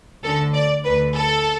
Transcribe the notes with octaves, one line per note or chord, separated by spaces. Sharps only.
D2 D3 A4
D5
D2 D3 B4
A4